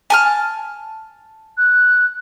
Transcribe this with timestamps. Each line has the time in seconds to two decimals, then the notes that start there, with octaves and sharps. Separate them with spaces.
0.10 G#5 A5 F6
1.57 F#6